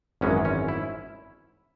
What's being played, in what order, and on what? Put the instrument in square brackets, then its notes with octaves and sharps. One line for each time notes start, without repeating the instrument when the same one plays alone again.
[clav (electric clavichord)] G#1 F#2 E3 G#3 C#4
C#4
E4